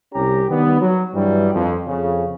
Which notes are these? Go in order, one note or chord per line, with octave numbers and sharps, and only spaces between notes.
C2 C#4 G4 A#5
D#3 G3 B3
F#3
G2 E3 F#3 G3
F2
F2 C#3